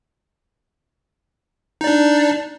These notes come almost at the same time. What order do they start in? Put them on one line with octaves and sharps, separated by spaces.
D#4 D5 D4